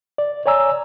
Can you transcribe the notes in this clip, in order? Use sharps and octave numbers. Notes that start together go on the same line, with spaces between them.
D5
C#5 D5 G#5 A#5 E6